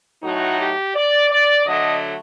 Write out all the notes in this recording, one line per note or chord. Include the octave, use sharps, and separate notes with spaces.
A2 F#3 A3 D#4 F#4
G4
D5
D5
D3 F#3 A3 D#5